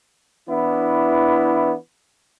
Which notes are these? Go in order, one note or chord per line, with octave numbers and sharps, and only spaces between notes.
E3 B3 D4 E4